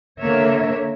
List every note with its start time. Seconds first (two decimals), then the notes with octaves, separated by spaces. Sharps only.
0.19 D3 A#3 A#4 C#5 E5